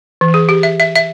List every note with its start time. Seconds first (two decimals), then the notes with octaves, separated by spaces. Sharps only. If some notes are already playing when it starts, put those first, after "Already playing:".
0.21 E3
0.34 G#4
0.49 G4
0.63 E5
0.80 E5
0.95 E5